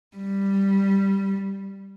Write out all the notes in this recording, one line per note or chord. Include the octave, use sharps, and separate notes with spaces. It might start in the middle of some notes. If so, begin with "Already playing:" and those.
G3